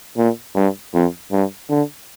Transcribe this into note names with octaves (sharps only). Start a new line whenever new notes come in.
A#2
G2
F2
G2
D3